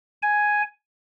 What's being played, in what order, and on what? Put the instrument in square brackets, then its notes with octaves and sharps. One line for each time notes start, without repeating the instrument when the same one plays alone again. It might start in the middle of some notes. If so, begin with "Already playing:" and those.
[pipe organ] G#5